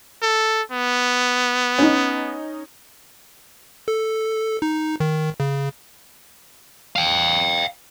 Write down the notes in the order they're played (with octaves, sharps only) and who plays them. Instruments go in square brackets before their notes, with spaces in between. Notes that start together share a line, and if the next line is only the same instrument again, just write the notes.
[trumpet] A4
B3
[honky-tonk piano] C#4 D#4
[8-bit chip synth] A4
D#4
D#3
C#3
[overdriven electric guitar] F5 G5